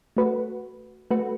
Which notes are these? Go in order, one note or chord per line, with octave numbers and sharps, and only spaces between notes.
A3 F#4 B4
A3 F#4 B4